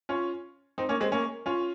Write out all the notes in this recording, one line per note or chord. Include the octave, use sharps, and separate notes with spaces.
C#4 F4
C4 D#4
A#3 C#4
G#3 C4
A#3 C#4
C#4 F4